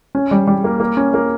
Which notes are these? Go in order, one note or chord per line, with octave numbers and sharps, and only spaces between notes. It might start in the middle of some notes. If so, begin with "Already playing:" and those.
C#4
G3
G3
A#3
A#3
C#4
A#3